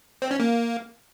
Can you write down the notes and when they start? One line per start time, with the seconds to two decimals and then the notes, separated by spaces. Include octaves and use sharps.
0.22 C4
0.31 C#4
0.40 A#3